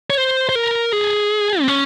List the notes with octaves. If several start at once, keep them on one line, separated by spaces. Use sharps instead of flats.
C#5
C5
C5
A#4
G#4
C4
C#4